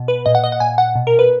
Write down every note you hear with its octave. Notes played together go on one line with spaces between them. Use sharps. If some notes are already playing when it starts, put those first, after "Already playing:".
Already playing: B2
B4
A#2 D#5
F#5
D#5
F#5
A#2 G#5
F#5
B2
A#4
B4